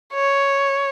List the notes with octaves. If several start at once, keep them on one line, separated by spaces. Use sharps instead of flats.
C#5